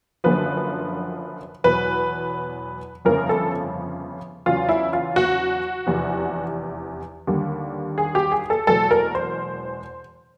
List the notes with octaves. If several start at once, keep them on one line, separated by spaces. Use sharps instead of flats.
F#1 F#2 D3 F3 B4
E2 B2 F#3 B4
G1 F2 C#3 F3 A#4
A4
E2 C#3 F#3 F4
E4
F4
F#4
F1 E2 C3
D#2 D3 G3
G#4
G4
G#4
A4
F#1 E2 B2 G#3 A4
A#4
C5